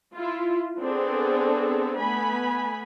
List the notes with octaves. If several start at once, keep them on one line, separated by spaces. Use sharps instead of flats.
E4 F4
B3 C4 D4 G#4 A4
A3 B3 G#5 B5